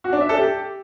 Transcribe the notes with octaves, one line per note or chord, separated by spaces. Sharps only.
F#4
D4
E5
A4
G4